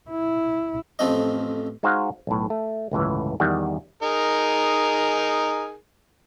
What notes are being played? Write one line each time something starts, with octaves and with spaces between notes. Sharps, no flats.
E4
A1 F2 F3 C4 D#5
G#3 D#4 F#4 C5 F5 F#5
B1 A2
A3
G1 C#2 A2 E3
E2 D#3 G3 F#5
D#4 G#4 A#4